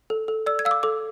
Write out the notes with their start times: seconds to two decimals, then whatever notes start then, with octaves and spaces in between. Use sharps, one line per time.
0.10 A4
0.28 A4
0.46 D5 E6
0.59 G#6
0.65 F5 E6
0.71 D6
0.83 A4 D6